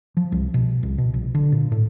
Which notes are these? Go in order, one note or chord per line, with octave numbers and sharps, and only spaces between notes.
F3
C2
B2
C2
B2
A#1
D3
A#2
A2